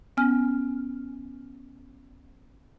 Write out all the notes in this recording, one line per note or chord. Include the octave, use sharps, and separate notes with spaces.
B3 C#4 G#5 F6